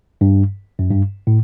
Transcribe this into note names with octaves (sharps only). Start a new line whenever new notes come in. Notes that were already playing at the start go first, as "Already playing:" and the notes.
G2
F#2
G2
A2